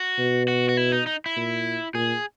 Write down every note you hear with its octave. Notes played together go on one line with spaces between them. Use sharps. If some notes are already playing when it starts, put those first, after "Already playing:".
Already playing: F#4
B2
F#4
F#4
E4
D#4
D#4
E4
A#2
A#2 G#4